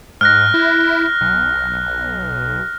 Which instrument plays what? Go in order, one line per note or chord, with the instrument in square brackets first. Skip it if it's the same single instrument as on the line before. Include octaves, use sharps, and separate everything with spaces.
[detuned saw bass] G#2 [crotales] F6 F#6 A#6
[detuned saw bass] E4
B1